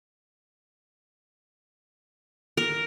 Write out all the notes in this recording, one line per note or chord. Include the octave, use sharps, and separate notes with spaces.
A#4